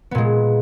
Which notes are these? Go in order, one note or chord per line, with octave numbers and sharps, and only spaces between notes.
A#2 G#3 B3